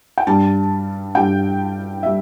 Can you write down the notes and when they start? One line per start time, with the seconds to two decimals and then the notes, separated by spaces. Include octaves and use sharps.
0.18 G5
0.27 G2 G3 A5
1.15 G2 G3 G5
2.03 G3 E5